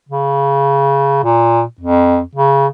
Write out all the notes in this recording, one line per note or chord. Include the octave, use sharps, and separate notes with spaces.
C#3
A#2
F2
C#3